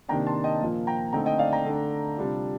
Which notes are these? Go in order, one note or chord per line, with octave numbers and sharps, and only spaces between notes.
C3 D#3 A#3 D4 G5 A#5
A5 C6
D#5 G5
A#2 F3 A#3
G5 A#5
D3 A3 C4 D#4 G5 A#5
D#5 G5
D5 F5
G5 A#5
D3 A3 D4
C3 G3 D4 F4